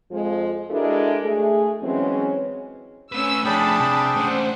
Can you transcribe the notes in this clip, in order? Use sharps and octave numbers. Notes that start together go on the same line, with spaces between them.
F2 F3 G#3
G#3 D4 E4 F#4 A4 A#4
A3 G#4
E3 F#3 G#3 C4 C#4
A3 C#4 B4 E6
F3 A3 D4 G#4 G5 A5 B5
C3
A3 C#4 C5 F#5